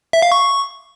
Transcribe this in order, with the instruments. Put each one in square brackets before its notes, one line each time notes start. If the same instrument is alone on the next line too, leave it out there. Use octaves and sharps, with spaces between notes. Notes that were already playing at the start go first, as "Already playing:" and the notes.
[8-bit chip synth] E5
F5
C#6